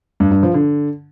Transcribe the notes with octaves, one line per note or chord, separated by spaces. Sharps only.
G2
G2
F3
D3